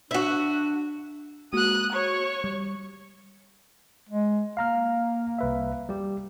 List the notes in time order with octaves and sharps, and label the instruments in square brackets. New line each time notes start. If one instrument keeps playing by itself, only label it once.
[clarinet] D4 [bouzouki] F#4 E5
[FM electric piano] G#3 A#3 F#4 [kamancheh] D#6 F#6
[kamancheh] C#5 C#6
[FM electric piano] G3
[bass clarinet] G#3
[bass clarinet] A#3 [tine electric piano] F5 A#5 F6
[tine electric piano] C2 B4 E5
G3 G4